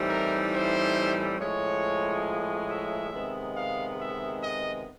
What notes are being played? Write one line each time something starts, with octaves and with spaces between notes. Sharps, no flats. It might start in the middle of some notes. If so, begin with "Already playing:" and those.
Already playing: A2 E3 G3 C4 D#4
A#4
C5
A2 F3 G#3 C#4 C#5
E5
C3 D#3 G#3 B3
F5
E5
D#5